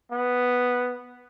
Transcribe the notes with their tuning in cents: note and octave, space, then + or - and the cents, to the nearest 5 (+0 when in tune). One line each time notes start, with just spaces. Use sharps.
B3 +0